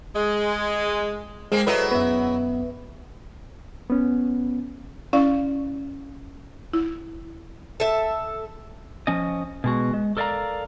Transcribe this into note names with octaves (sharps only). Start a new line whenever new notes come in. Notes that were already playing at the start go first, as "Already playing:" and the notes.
G#3
G#3 A#3 C4 G#4
F#3 E4 A4 B4 C#5 D#5 A#5
F#2 B3 B4 E5
B3 C#4
C#4 E4 D5 F5
E4
A4 E5
F3 C#4 D#5
B2 G#3 F#4
G#3
A4 A#4 D5 D#5 F5 A#5